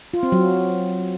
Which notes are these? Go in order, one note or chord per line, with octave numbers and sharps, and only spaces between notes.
F4
C4
F#3